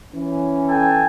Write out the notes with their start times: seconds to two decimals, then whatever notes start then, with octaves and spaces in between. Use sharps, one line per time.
0.13 E3 C#4
0.69 A4 G5 G#5